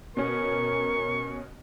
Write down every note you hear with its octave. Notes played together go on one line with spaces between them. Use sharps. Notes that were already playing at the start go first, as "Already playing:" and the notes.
B2 C#4 A#4 C#6